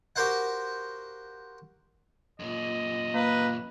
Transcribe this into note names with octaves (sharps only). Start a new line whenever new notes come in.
F#4 G4 A#4 C5 F5 F#5
F#2 A#2 D#5
A#3 B4